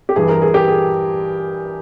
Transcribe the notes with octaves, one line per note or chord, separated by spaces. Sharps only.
G4
G2 E3 G#4
A#4
G#4
G4
G#4